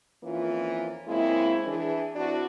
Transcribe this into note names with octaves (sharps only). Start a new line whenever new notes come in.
F2 E3 A#3 C#4 F4
C#3 G#3 A#3 C4 E4
E3 D4 G#4
C4 D4 E4 F#4